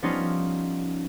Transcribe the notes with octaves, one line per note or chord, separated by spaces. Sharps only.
F3 G3 B3 C#4 D#4 F4